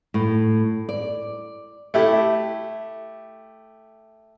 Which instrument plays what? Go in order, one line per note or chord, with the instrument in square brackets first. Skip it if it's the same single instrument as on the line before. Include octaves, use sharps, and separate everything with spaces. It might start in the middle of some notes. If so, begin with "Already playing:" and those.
[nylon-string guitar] A2
D5
[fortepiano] A3 E4 G4